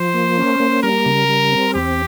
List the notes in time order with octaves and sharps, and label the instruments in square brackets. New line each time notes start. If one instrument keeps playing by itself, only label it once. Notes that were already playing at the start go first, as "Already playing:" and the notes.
Already playing: [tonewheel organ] F3 [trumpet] C5
[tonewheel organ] A#3
C#4
A#3
[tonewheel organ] G3 [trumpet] A#4
[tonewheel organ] C#3
G3
C4
[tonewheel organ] E2 [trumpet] G4